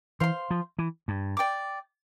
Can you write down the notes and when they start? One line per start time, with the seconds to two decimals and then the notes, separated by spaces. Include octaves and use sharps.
0.20 E3 C5 F5 C6
0.51 F3
0.79 E3
1.08 G2
1.37 D5 G5 D6